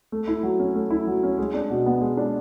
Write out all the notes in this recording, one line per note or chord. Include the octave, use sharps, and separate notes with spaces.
A3
E4
F#3
C#4
A3
E4
F#3
C#4
G#3
D4
B2
B3
G#3
D4